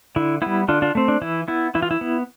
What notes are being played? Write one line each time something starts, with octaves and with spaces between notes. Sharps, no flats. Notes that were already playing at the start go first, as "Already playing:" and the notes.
D3 E4
G3 B3 E4
D3 D4 F4
D4 F4
A3 C4
D4
E3 E4
B3 E4
E3 E4
F4
E4
B3